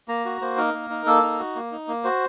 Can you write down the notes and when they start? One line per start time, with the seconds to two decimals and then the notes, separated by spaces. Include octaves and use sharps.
0.08 A#3 A#5
0.25 F#4
0.41 A#3 C5
0.57 D#4 A#4
0.74 A#3
0.90 D#4
1.06 A#3 A4
1.23 D#4
1.39 F#4
1.56 A#3
1.72 D#4
1.88 A#3
2.04 F#4 C5